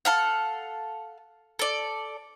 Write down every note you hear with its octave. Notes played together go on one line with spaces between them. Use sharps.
A4 F5 F#5
A4 D5